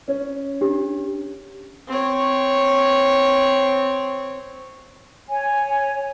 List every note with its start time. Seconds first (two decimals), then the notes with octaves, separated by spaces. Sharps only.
0.08 C#4
0.61 D4 G4
1.88 C4 C#5
5.29 C#5 G#5